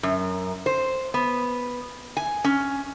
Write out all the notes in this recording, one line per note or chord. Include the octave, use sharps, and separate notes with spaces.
F#2
C5
B3
G#5
C#4